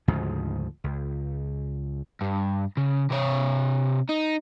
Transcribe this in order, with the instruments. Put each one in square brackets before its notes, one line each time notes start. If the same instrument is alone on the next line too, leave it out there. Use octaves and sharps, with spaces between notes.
[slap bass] D2 G#2 C#3 F3
C#2
[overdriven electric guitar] G2
C#3
C3 C#5
D#4